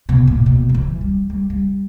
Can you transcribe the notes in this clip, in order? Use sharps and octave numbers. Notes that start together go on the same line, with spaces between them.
B2
A#2
B2
G3
E3
G3
G3
G3